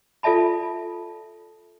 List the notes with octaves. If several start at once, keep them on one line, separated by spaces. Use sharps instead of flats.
F4 A4 D5 E5 A5 B5